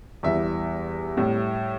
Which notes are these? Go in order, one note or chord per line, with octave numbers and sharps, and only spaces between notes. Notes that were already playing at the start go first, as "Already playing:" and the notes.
E2 E3 G3 E5
A2 G3